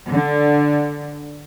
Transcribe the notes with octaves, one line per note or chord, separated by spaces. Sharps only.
D3